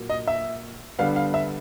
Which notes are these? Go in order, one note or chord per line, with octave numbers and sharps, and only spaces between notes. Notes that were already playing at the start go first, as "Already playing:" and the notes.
Already playing: A#2 F#3 A#3
D#5
E5
D3 G3 B3 F5
F5
E5